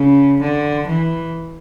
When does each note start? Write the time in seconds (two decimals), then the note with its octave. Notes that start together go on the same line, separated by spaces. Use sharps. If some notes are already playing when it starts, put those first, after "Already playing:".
Already playing: C#3
0.41 D3
0.87 E3